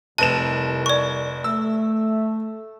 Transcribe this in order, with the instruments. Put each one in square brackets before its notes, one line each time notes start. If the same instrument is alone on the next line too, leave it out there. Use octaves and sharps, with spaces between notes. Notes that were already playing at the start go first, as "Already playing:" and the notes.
[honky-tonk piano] F1 E7 [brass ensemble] C2 [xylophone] B4 A5
[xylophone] D5 C#6
[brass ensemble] A3 [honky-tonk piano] E6